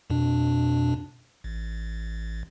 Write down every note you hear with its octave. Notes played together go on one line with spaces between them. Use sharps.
F2 B2 D4
A1